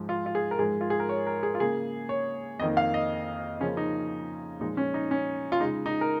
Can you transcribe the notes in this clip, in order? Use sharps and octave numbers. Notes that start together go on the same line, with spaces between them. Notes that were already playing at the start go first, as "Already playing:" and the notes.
Already playing: G#2 F3 G#3
F4
F4
G#4
A#4
G#2 F3 G#3 G#4
F4
G#4
A#4
C#5
A#4
G#4
F4
C#3 A#3 G#4
C#5
F2 D#3 A#3 D#5
F5
D#5
C#3 F3 A#3 C#4
D#4
A#2 F3 G#3 D#4
C#4
D#4
C#4
F4
C#3 G#3 D#4
D#4
A#4